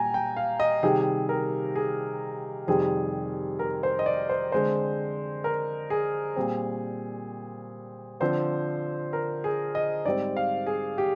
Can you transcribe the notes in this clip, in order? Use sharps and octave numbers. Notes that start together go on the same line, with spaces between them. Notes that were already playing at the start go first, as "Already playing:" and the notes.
Already playing: A#2 G3 G5 G#5 A#5
G5
F5
D#5
C3 D#3 G3 G#4
A#4
G#4
F2 C3 D#3 G3 G#4
A#4
C5
D#5
D5
C5
D3 G#3 C4 C5
A#4
G#4
A#2 G3 C4
D3 F3 C4 C5
A#4
G#4
D#5
G#2 G3 C4 D5
F5
G#4
G4